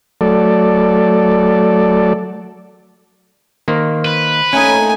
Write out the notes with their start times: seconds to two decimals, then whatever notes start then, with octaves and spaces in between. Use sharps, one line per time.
0.21 F#3 A3 A4 D5
3.68 D#3 A#3 C5
4.05 B4
4.53 A3 A#3 C#4 D#4 G#5